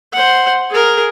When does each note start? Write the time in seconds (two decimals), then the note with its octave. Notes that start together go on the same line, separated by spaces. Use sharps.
0.13 C5 F#5
0.71 G#4 A#4